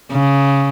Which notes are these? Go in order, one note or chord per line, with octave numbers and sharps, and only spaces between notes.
C#3